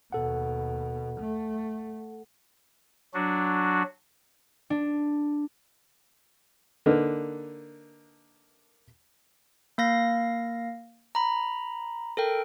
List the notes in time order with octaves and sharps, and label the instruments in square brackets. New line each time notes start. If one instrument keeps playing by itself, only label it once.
[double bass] D#2 B2 [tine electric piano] A4 F#5
[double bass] A3
[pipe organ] F#3 D4 F#4
[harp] D4
[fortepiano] D3 A#3 D#4 B4
[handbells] A#3 F5 A#6
A#5 B5
A4 A#4 G5